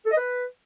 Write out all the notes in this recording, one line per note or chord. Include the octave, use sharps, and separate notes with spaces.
A4
D#5
B4